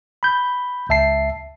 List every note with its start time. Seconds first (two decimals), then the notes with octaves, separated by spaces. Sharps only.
0.23 B5 G6
0.89 C#2 E5 A5 C7